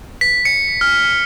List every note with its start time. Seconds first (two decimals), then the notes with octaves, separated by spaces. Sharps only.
0.21 B6
0.45 C#7
0.81 F6